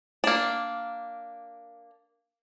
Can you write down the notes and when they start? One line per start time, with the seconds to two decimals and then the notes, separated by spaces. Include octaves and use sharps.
0.24 A#3 D4